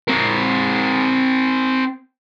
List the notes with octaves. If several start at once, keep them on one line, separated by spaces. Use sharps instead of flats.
C4 A#4